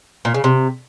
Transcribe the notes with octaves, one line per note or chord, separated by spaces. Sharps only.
A#2
C#3
C3